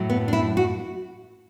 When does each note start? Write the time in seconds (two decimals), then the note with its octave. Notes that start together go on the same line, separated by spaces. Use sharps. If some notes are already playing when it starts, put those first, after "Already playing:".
Already playing: A2 F#3
0.10 B3
0.28 D4
0.33 E4
0.57 F#4